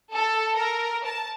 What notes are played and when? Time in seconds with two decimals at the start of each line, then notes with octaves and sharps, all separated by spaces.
0.13 A4
0.56 A#4
1.05 A5